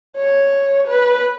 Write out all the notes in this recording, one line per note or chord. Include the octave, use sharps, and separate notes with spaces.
C#5
B4